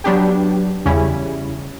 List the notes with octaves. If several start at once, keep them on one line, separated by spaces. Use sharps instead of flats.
F#3 B3 D4 G4
E2 C#3 G3 C#4 E4